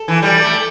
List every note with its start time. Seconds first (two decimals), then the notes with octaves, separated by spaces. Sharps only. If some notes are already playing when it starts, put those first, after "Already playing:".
Already playing: A4
0.08 E3
0.22 G3 D5
0.42 A3